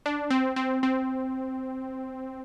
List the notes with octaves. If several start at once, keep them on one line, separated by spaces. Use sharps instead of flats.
D4
C4
C4
C4